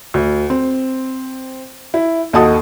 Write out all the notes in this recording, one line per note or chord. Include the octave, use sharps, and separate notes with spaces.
D2
C4
E4
D#2 F#4 A4 D#5 A5 D#6